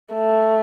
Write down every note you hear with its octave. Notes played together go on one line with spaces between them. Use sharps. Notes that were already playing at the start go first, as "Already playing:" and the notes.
A3